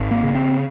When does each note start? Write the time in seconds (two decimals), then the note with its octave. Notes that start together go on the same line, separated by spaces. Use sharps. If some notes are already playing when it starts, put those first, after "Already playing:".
Already playing: G#1
0.11 A#3
0.24 C#3
0.35 C4